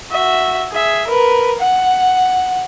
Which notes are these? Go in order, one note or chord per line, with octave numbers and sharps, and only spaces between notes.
F#4 E5
G#4 E5
A#4 B4
F#5